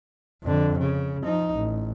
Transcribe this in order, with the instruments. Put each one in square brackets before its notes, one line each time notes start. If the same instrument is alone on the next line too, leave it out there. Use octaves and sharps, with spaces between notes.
[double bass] F2 D3
C#3
F3 D#4
A1